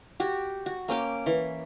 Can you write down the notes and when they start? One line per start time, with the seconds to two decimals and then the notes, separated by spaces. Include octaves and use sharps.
0.20 F#4 G4
0.66 F#4
0.88 A#3 C#4 G5 D6
1.26 E3